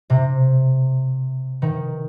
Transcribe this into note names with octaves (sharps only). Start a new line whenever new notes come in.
C3
D#3